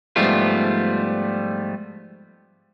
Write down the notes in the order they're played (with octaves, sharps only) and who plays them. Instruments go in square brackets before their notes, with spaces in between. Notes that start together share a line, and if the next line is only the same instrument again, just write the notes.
[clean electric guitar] G#2 F3 G3 A3 B3 F4